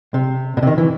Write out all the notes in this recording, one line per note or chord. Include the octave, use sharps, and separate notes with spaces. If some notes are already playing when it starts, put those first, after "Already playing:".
C3
B2
C3
D#3
E3